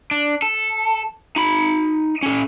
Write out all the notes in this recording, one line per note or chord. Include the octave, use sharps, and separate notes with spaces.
D4
A4
D#4 B5
C#4 A4